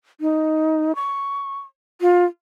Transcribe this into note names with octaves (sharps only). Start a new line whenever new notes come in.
D#4
C#6
F4